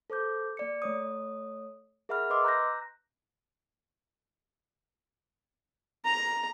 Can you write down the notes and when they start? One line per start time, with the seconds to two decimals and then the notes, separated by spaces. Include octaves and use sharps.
0.10 A4 C5 D6 G6
0.57 A#3 D5 C#7
0.82 A3 C#5 D#6
2.09 G#4 A#4 E5 F#5 B5 F6
2.30 B4 D#5 C6 D6 E6
2.44 A#5 F#6 G6 A#6
6.05 A#5